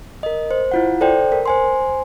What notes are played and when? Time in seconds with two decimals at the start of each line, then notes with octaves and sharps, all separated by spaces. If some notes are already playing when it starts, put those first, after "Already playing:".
0.23 A#4 D#5
0.51 C5
0.71 E4 F4 F#5
1.01 A4 C5 D5 G5
1.32 A#4
1.46 C5 G#5 C6